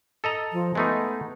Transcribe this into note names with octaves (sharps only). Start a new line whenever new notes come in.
A4 D#5 A#5
F3
G#3 A3 B3 D#4